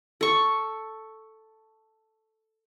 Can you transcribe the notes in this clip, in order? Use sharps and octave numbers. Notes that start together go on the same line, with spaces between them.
A4 C#6